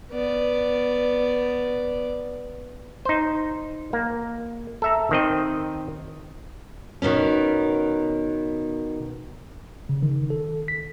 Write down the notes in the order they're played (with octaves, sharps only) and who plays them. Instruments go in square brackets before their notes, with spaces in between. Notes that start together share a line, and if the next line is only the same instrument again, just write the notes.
[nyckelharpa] B3 D5
[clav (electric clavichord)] D#4 C5
A#3
A4 E5 A#5
D#3 C4 D#5
[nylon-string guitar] B2 D#3 B3 C#4
[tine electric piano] C#3
D#3
A4
B6